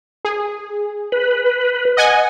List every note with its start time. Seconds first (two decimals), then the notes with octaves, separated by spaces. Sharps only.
0.25 G#4
1.12 B4
1.97 D#5 F#5 G#5